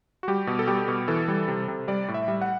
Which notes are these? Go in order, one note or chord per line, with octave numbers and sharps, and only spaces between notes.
F#4
G3 G4
B2
A4
G3 G4
B2
E3 A4
G3
C3
C3
G3 D5
A2
E5
G3
F#5